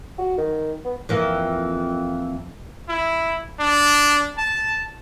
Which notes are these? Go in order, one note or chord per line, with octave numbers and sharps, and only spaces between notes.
F#4
D#3
B3
F2 E3 A#3
E4
D4
A5